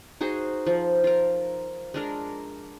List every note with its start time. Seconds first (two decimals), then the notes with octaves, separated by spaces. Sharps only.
0.21 D#4 F#4 G#4 C5
0.67 F3
1.04 F4 A#4
1.94 G#3 D4 A#4